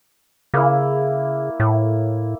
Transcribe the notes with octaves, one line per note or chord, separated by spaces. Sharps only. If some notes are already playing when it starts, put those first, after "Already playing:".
C#3 A#3 E4
A2